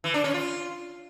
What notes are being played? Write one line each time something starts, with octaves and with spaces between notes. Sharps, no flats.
E3
D4
C#4
F4